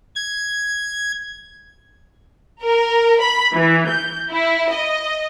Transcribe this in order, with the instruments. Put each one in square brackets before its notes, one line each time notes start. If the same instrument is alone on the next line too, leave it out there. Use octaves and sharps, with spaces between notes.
[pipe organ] G#6
[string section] A#4
B5
E3
G6
E4
D#5